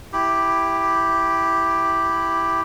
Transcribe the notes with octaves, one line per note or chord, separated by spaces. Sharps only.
E4 G4